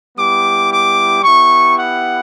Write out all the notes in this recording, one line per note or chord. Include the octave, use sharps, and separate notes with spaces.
G3 B3 E4 G4 D6
D6
B3 E4 G4 C#6
F#5